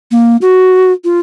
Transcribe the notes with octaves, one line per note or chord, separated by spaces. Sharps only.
A#3
F#4
F4